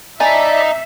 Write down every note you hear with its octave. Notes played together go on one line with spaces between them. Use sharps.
D#4 D5 E5 G#5 A5 B5